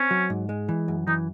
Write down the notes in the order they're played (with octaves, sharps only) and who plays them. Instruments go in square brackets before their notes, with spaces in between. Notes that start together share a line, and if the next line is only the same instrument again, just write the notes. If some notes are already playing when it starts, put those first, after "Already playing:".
Already playing: [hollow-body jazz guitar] C4 [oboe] C#4
[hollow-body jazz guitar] F#3
G#2
G#3
E3
F#2
[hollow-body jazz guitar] E3 [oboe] D#4